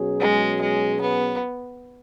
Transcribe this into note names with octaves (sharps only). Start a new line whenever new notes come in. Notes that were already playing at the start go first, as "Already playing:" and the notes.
Already playing: B2 F#3 C#4 G#4
G#3
G#3
B3